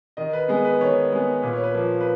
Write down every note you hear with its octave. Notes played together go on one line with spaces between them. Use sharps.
D#3 D#5
B4
G#3 B3 G#4
B4
D#3 C#5
G#3 B3
A#2 B4
C#5
B4
F3 A#3
B4